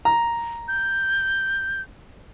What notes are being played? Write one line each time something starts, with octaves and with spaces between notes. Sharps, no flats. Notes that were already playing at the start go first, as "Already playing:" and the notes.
A#5
G6